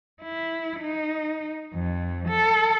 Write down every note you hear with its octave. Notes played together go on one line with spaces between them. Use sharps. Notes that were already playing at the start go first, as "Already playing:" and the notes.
E4
D#4
F2
A4